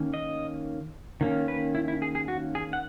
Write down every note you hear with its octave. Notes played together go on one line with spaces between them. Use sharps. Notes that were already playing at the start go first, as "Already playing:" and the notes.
Already playing: D#3 A#3 C#4
D#5
D#3 A#3 C#4
B4
E4
E4
G#4
G#4
F#4
G#4
F#5